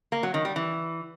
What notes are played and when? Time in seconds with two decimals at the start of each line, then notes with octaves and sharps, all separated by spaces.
0.12 A#3
0.23 F#3
0.34 D#3
0.45 G3
0.56 E3